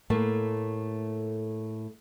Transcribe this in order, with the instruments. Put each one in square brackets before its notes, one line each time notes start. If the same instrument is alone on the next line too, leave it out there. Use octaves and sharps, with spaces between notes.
[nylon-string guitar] A2 A3 A#3